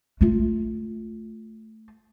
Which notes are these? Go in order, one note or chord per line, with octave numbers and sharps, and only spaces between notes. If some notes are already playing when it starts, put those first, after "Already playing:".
A3 F4